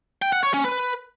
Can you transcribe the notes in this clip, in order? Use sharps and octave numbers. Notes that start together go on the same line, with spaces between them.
G5
F#5
C#5
C#4
B4